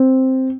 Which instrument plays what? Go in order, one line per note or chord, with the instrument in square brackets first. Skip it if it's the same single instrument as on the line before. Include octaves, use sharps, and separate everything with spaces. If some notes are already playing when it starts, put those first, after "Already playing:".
Already playing: [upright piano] C4